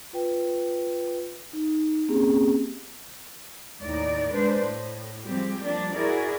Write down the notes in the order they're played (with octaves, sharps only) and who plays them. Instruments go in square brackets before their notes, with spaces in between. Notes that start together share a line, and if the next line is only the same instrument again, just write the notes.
[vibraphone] F4 B4 G5
D#4
A#3 C4 C#4 G4 G#4
[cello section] D#2 A2 D#4 D5
G#3 D4 B4 C5
A2
F3 G3 G#3 C4 G4
F3 G3 A#3 D4
E4 F#4 G#4 A#4 D5